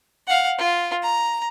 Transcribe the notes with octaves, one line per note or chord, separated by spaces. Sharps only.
F5 F#5
F4
A#5